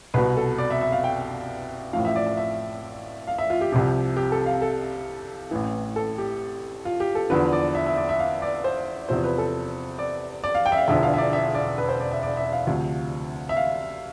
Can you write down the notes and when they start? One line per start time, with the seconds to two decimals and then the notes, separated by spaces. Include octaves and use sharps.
0.14 C2 B2 B4
0.37 A4
0.58 D5
0.70 E5
0.81 E5
0.92 F5
1.04 G5
1.93 A1 A2 F3 F5
2.05 E5
2.16 D5
2.26 E5
2.37 E5
3.27 F5
3.38 E5
3.50 F4
3.61 G4
3.72 C2 C3 F3 G4
4.17 G4
4.32 A4
4.46 F5
4.62 A4
5.51 A1 A2 E3
5.96 A4
6.18 G4
6.85 F4
7.00 G4
7.15 A4
7.30 E2 D3 F3 B4
7.53 D5
7.75 E5
7.86 E5
7.97 D5
8.09 E5
8.19 F5
8.42 D5
8.64 C5
9.09 E2 C3 F3 C5
9.24 B4
9.38 A4
9.99 D5
10.44 D5
10.55 F5
10.66 G5
10.72 E5
10.77 F5
10.88 E1 E2 D3 F3 E5
11.03 F5
11.14 E5
11.18 D5
11.33 E5
11.55 D5
11.78 B4
11.89 C5
12.00 D5
12.11 E5
12.23 D5
12.37 E5
12.52 F5
12.67 D2 C3 F3
13.49 E5
13.57 F5